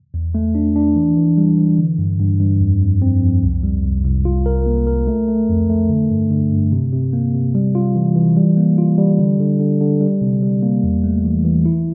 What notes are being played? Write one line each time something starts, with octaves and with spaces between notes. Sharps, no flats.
E2
A3
D4
D4
E3
E3
G3
E3
D3
G2
G2
G2
F2
F2
C4
F2
C2
G3
C2
C2
F4
A#4
A#3
A#4
A3
A3
F2
A3
D3
G2
D3
G2
C3
C3
A#3
C3
G3
F4
E3
E3
G3
A#3
F4
G3
D3
D3
D3
D3
G3
C3
G3
A#3
E2
A3
E3
E3
E4